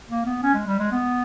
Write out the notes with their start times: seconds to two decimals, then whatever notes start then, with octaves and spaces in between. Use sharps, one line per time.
0.10 A#3
0.26 B3
0.43 C#4
0.54 G#3
0.67 G3
0.79 G#3
0.92 B3